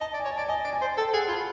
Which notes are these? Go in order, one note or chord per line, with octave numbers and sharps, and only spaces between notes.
D#5 A5
D5
G#5
C#5 A5
D5 A5
D#5 G#5
D5
G#5
C5
A4 G5
G#4 F#5
F4 B5